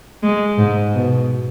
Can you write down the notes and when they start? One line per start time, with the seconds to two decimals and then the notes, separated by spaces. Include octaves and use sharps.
0.23 G#3
0.58 G#2
0.93 B2